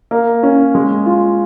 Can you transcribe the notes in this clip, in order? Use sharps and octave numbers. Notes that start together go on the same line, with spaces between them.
A#3
C#4
G#3
F4